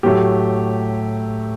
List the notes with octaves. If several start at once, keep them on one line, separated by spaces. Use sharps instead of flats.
A2 F#3 A3 G4